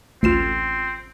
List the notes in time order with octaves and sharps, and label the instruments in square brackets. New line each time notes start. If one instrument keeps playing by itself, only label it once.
[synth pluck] A1 F4 [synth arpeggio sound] D2 C7 E7 [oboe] C4